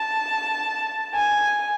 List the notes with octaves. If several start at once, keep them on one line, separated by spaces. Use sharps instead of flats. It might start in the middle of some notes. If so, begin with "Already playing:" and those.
Already playing: A5
G#5